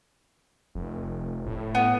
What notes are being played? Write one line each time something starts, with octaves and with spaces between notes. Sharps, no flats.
F1
A2
B3